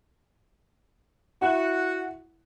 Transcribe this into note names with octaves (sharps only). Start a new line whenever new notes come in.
E4 F#4 F#5